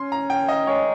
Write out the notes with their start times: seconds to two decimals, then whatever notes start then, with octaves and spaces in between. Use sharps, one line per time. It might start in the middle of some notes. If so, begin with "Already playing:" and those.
Already playing: C#4 C6
0.12 A#5
0.30 D#3 G5
0.48 D#5
0.67 G#3 C#5